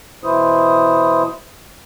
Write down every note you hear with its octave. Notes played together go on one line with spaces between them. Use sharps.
B2 E3 E4 C5 D#6